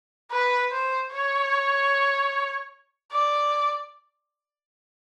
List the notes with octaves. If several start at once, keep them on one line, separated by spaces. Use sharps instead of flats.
B4
C5
C#5
D5